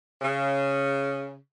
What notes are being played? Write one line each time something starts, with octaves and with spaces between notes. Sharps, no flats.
C#3